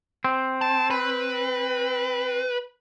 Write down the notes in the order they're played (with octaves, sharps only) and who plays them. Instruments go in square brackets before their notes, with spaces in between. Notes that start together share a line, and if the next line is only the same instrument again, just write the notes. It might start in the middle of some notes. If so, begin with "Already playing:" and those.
[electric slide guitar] C4
[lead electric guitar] A5
B4